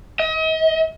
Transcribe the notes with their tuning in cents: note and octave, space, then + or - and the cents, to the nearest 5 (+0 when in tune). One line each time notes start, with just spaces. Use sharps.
D#5 +40